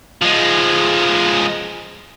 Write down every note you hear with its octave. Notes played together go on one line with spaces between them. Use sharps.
F3 G#3